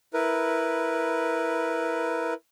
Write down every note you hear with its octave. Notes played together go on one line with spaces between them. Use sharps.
E4 A#4 B4